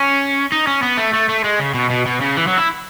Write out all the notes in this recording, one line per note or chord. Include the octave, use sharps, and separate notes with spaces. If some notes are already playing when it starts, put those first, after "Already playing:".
Already playing: C#4
D#4
C#4
B3
A3
A3
A3
G#3
C#3
B2
B2
B2
C#3
E3
F#3
E4